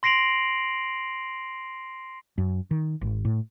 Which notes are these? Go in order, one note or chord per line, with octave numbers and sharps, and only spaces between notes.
C6 A#6 C7 D7 F7 F#7
F#2
D#3
G#1
A2